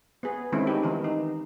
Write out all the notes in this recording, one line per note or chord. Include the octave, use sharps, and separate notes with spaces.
B3 G#4
D#3 G#3 A3 C4 C#4 E4
D#4 G4
D#3 E3 B3 D#4
D#4